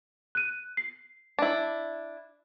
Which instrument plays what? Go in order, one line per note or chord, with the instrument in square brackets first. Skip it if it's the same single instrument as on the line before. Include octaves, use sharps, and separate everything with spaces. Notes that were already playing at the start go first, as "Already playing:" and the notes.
[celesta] F#6 D#7
C7
[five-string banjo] D4 E4